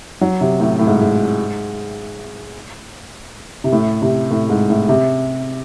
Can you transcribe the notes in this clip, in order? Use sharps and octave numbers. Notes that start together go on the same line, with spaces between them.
F#3
C3
A2
A2
G#2
G#2
C3
A2
C3
A2
G#2
A2
C3